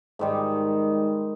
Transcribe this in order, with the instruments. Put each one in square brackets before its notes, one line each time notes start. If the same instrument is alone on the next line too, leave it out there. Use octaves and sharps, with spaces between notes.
[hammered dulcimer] G#2 D#3 G3